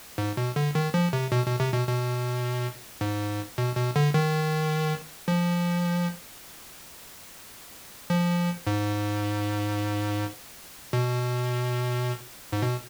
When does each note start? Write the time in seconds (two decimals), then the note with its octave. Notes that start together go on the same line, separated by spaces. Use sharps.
0.18 G#2
0.37 B2
0.56 D3
0.75 D#3
0.94 F3
1.13 C3
1.32 B2
1.46 B2
1.60 C3
1.73 B2
1.88 B2
3.01 G#2
3.58 B2
3.77 B2
3.96 D3
4.14 D#3
5.28 F3
8.10 F3
8.67 G#2
10.93 B2
12.53 G#2
12.62 B2